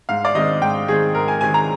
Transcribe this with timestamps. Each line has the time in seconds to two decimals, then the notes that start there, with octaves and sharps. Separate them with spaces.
0.09 G#2 F5
0.25 D5
0.35 D#3 G#3 C4 D#5
0.61 G#2 G5
0.88 D#3 G#3 C4 G#4
1.14 G#2 A#4
1.28 G#5
1.41 D#3 G#3 C4 G#5
1.54 A#5